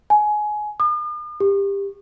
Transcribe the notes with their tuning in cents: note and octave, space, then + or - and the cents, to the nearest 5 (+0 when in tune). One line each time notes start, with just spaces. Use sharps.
G#5 +20
D#6 -45
G4 +20